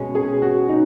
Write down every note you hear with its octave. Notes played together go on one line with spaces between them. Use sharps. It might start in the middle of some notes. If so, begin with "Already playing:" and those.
Already playing: B2 G#3 C#4
G#4
F#4
D#4